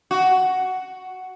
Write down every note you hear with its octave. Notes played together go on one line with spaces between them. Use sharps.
F#4